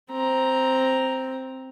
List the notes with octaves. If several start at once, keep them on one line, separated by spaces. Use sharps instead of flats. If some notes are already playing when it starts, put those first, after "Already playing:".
C4 A#5